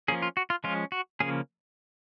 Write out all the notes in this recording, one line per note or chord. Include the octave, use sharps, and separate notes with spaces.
F3 A#3 C#4 G#4
F4
F#4
F4
F3 G#3 C#4 F4
F#4
C#3 F3 A#3 C#4 G#4